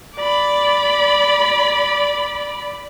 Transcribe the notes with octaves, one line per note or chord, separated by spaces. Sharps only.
D5 B5